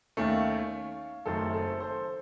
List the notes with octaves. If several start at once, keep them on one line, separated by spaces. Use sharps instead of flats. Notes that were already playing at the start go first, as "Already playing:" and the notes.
D#2 D#3 A3 C#4 C#5 F5
F#1 F#2 D#3 A3 C4 A4 C5
A4 C5
A4 C5